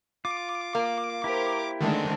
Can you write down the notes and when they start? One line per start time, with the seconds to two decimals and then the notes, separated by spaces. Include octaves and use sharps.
0.25 F4 D6
0.75 A#3
1.24 E4 G4 A#4 C5
1.81 D3 D#3 G#3 A3 C4 D4